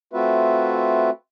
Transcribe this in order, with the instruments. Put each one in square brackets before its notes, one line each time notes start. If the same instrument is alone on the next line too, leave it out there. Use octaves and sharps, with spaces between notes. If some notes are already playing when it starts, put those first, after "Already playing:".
[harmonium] A3 C4 F4 F#4 B4 E5